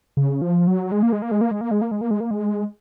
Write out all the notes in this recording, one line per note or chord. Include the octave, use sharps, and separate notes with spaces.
C#3
F3
F#3
G#3
A#3
G#3
A#3
G#3
A#3
G#3
A#3
G#3
A#3
G#3
A#3
G#3
A#3
G#3